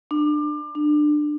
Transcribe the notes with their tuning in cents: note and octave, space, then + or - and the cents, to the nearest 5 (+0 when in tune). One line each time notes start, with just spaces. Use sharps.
D4 +30
D4 +25